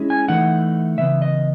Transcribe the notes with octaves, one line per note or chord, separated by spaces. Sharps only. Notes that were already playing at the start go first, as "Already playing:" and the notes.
Already playing: G#3 C#4 E4
G#5
E3 A3 D#4 F#5
C#3 E3 B3 E5
D#5